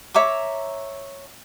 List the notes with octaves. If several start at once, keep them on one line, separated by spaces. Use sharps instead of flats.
C#5 E5 A#5 D6